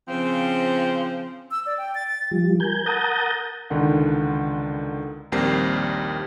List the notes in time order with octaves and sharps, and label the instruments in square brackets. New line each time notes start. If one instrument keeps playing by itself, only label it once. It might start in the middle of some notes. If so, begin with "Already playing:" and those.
[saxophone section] C#3 F3 C4
[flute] E6
D5
G5
A6
A6
[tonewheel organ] F3 G3
A#4 G#5 G6
A#4 F#5 A5 A#5 D#6 G6
[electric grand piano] C#2 D3 D#3 F#5
A#1 D#2 G3 C4 A#4 C7